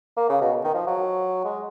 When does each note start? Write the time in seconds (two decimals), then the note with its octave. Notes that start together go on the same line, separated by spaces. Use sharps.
0.17 A#3
0.29 C#3
0.41 B2
0.64 D#3
0.74 F3
0.87 F#3
1.44 G#3